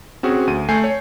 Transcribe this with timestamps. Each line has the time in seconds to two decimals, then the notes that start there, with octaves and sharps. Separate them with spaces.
0.23 C4 C#4 F#4 G#4
0.47 D2 D#7
0.69 A3 G#5 G6 C7
0.84 C#5